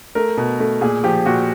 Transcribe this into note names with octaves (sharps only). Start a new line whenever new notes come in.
A3 A#4
B2
A3
A#2 G#4
F3 G4
A#2 F#4